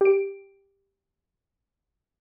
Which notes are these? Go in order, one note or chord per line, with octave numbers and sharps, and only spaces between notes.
G4 D7